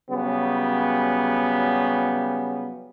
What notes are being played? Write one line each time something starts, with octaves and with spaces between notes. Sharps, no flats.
C#3 F#3 G3 B3